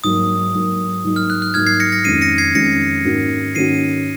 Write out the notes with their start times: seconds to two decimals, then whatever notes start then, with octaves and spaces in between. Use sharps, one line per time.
0.04 G#2 F#3 A#3 D#6
0.54 G#2 F#3 A#3
1.04 G#2 F#3 A#3 D#4
1.16 F6
1.30 F#6
1.42 F#6
1.54 G#2 F#3 A#3 D#4 F6 G#6
1.67 G#6 C7
1.80 A#6 C#7
1.92 A#6 C#7
2.04 F2 D#3 G#3 C#4 C7 D#7
2.21 A#6 C#7
2.38 G#6 C7
2.55 F2 D#3 G#3 C#4 A#6 C#7
3.05 G#2 D#3 A#3 C#4 F#4
3.55 G#2 D#3 A#3 C#4 F#4 C7 D#7